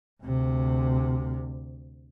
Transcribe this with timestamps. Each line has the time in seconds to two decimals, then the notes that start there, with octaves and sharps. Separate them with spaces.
0.23 D2 C3